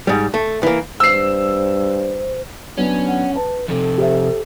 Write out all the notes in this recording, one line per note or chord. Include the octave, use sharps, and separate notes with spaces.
G#2 G3
A3
E3 A#3
G2 C5 E6 C7
F#3 B3 C#4 D4
F#5
B4 A5
F2 C3 A4
G4 C5 E5